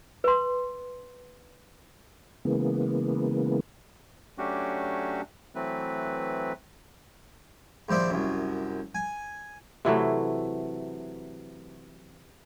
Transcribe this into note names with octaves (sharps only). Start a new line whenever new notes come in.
B4 C6
C#3 E3 G#3 A#3 B3
F#3 A3 C#4 D4 F#4 G4
E3 F#3 A3 C4 B4
A#1 D#2 C5 D5 E5
C2 F#2
G#5
C3 E3 F#3 A3